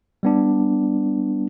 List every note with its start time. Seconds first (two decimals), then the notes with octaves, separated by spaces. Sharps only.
0.23 G3 B3 D4